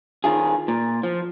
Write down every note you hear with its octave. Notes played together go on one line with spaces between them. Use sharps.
D#3 F4 G#4
A#2
F3